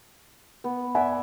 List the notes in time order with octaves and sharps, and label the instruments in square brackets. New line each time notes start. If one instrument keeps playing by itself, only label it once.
[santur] B3
[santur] D5 E5 [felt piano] F#5 G#5